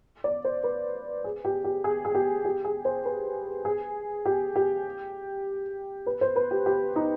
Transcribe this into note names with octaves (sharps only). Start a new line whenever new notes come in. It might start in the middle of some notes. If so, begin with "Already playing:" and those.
D5
C5
B4
G#4
G4
G4
G#4
G#4
G4
G4
G#4
C5
B4
G#4
G4
G4
B4
C5
B4
G4
G4
D#4